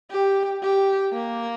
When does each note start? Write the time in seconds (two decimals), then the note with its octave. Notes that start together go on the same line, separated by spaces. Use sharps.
0.11 G4
0.62 G4
1.12 A#3